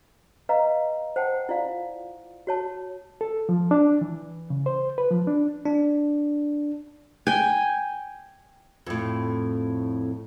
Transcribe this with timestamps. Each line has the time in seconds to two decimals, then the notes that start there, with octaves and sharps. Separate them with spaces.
0.49 B4 D#5 F5 A#5
1.16 C5 F#5 G5 A5
1.49 E4 F4 D5 F5
2.47 F#4 C#5 A5
3.21 A4
3.49 F3
3.71 D4
4.01 E3
4.50 C#3
4.66 C5
4.98 B4
5.11 F3
5.27 D4
5.65 D4
7.27 G5 G#5
8.87 F2 A2